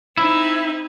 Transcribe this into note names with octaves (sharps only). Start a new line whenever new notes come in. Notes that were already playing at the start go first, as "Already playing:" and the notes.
C4 D#4 E4